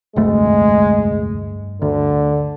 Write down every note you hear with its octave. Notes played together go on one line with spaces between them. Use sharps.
F1 D2 G2 G#3 A3
D2 D3